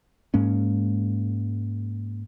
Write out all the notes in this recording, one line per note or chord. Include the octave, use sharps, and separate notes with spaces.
G#2 G#3 A#3 C#4